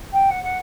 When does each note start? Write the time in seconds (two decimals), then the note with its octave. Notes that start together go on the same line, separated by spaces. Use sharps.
0.12 G5
0.30 F#5
0.44 F#5